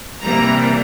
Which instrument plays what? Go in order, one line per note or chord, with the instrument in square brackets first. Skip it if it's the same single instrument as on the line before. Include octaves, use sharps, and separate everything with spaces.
[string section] C3 E3 G3 A#3 A#5